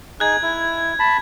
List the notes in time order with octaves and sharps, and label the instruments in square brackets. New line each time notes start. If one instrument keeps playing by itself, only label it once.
[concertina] D#4 G#4 [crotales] F#6 G#6
[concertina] E4
A5 B5